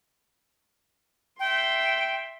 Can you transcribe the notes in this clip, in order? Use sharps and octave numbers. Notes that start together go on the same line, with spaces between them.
E5 G5 C6